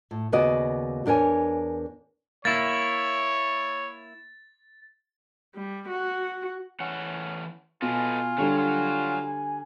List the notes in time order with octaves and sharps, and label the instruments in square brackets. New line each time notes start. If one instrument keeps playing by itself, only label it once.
[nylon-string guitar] A2
D#2 C#3 B3 F#4 D5 D#5
E2 D4 A#4 C#5 G#5
[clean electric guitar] A#3 E4 [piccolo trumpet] C#5 [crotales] A6
[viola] G3
F#4
[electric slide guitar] E3 A3 F#5 [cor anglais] C#4
[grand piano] B2 [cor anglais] F4 [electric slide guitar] A4 B4 D#5 [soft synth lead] G#5
[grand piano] D3 G3 D4 [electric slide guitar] F#3 C#5
[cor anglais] F4